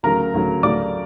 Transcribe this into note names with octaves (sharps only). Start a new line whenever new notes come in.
D2 C#3 F#3 A#4 A#5
D2 C#3 F#3
D2 C#3 F#3 D5 D6